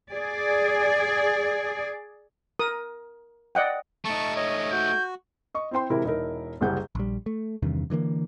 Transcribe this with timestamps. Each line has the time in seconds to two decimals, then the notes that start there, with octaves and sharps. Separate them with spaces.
0.11 G#4 D5
2.59 A#4 D#6
3.55 D5 D#5 F#5 G5
4.05 A3 D#4 A5 C#6
4.36 C#5 D#5
4.72 F#4 G6
5.54 D#5 C#6
5.71 C4 E4 C5 G5 C6
5.90 C3 E3 G#3 E4 A#4
6.04 E1 D#4 E4 A#4
6.61 F#1 C2 G3 G#4 F#5 G6
6.95 A#1 G3
7.26 A3
7.62 E2 G2 C3 D#3
7.90 D3 E3 A3 A#3